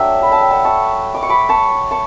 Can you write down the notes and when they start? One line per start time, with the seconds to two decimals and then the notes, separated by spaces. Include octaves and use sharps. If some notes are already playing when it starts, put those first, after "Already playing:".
Already playing: F#3 A3 D4 E5 G5
0.22 B5
0.32 A5
0.41 G5
0.51 F#5 A5
0.65 A5 C#6
1.15 D6
1.23 C#6
1.29 B5 D6
1.49 A5 C#6
1.91 A5 C#6